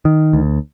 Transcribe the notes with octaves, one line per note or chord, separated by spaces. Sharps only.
D#3
D2